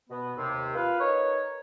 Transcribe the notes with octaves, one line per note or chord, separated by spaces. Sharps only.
B2 B3
D#2 C3
F4 B4 F5
D#4 A#4 B4 C#5